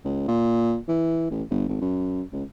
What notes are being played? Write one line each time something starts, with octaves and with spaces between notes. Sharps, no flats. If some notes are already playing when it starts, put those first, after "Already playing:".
C#2
A#2
E3
A1
G1
G#1
F#2
C#2